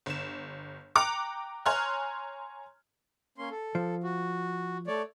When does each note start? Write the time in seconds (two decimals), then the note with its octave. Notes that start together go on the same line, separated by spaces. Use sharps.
0.06 G1 E7
0.95 G5 A#5 D6 F#6 C#7 F7
1.66 C#5 G#5 A#5 C6 F6 F#6
3.38 A#3 C#4 C6
3.50 A4
3.75 F3
4.03 F#4
4.87 A3 C#5 D5